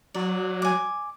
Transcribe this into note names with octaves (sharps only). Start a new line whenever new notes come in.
F#3 D5
G#5 D6